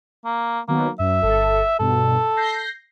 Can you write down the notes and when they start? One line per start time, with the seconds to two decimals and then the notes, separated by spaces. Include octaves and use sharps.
0.25 A#3
0.68 D#3 F#3 A#3 B3
0.99 F#2 E5
1.22 G1 A4
1.79 G2 B2 A4
2.37 G6 A#6 C7